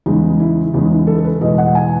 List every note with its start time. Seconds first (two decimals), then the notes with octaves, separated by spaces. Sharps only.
0.06 E2 C#3 E3 G#3 D#4
0.40 E4
0.74 E2 C#3 E3 G#3 D#4
0.91 D#4
1.07 A4
1.18 A4
1.25 B4
1.41 E2 B2 G#3 D#5
1.58 F#5
1.75 G#5